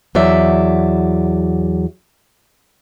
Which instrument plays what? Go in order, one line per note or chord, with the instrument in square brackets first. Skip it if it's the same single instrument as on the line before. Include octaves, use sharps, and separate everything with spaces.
[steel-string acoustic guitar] E2 F#3 D5 E5